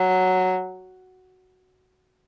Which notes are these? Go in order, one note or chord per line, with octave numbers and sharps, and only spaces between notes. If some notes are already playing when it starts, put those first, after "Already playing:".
Already playing: F#3